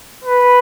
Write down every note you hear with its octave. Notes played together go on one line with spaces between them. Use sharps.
B4